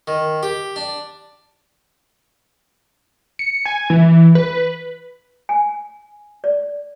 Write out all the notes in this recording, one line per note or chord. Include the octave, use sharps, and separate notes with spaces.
D#3
G4
D4
C#7
G#5
E3
B4
G#5
D5